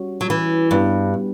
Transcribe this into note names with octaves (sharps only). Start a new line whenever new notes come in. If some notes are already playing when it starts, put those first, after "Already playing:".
Already playing: G3 C#4 F#4 C#5
F#3
E3
G2 G3 B3 D4 G4 B4